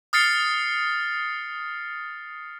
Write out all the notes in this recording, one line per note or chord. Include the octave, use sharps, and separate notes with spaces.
D#6 F6 A6 C7 C#7